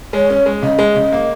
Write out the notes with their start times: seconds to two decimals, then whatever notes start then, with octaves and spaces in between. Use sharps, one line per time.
0.13 G#3 C#5
0.30 C#4
0.46 G#3
0.62 C#3 D#5
0.79 G#3
0.96 C#3
1.12 A#3